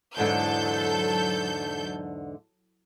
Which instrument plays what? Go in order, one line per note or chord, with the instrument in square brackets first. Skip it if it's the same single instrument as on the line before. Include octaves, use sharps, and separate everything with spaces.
[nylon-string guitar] E2 G#2 D3 [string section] F#3 A4 G6